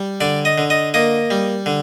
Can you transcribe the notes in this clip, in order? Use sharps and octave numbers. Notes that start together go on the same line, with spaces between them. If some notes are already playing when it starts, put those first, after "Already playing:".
Already playing: G3
D3 D5
D#5
D3
D#5
A#3 D#5
G3
D3